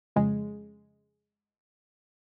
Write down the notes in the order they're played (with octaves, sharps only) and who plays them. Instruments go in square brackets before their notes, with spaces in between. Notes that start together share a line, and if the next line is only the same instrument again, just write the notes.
[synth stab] F2 C#3 G#3